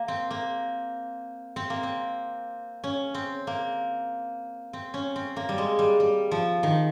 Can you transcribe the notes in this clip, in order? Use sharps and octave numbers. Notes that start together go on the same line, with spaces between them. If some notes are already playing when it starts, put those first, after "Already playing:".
Already playing: A#3
C4
A#3
C4
A#3
C4
C#4
C4
A#3
C4
C#4
C4
A#3
G3
G#3
G3
G3
F3
D#3